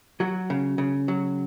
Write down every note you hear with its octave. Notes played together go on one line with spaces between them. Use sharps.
F#3 F#4
C#3
C#3
F#3